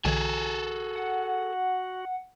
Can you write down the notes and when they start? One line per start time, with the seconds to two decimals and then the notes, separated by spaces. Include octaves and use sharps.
0.05 B1 D3 E3 F#4 G#4 A4 G#5
0.96 F#5